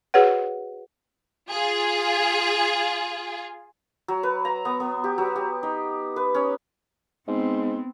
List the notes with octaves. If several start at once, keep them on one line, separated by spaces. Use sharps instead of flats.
F#4 G#4 B4 C#5 F#5
F4 G#4
F#3
B4
A#5
B3
B3
G4
F#3
G4
D#4
B4
C#4
G#2 B3 C4